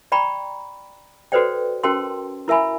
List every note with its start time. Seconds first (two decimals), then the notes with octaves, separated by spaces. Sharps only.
0.12 D5 G5 A#5 B5 C#6
1.32 F#4 A4 B4 C5 D5 G5
1.83 C#4 F#4 A#4 G5 A5 C6
2.48 E4 A#4 E5 G#5 B5